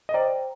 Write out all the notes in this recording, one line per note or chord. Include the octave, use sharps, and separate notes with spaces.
D#5
C5 D5 G5 A#5